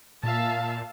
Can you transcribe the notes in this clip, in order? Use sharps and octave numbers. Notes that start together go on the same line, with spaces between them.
A#2 E5 F5 A5